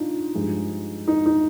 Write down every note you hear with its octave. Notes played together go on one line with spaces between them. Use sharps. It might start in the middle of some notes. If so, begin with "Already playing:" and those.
Already playing: D4 D#4 F4
G2 F3 G#3
D#4
D#4